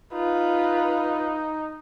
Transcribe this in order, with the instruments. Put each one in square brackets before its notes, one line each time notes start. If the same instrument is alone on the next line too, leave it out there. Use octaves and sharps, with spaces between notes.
[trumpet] D#4 [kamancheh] F4 B4